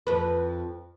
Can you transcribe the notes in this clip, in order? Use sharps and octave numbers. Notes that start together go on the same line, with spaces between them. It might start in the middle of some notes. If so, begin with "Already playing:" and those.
F2 B4